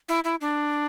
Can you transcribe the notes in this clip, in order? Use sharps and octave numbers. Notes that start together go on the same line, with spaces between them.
E4
E4
D4